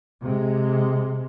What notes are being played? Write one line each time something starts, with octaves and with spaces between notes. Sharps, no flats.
C3 G#3